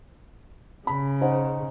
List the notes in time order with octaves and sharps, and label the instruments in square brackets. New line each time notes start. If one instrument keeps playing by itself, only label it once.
[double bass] C#3 [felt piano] B5
[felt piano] D#4 C5 F#5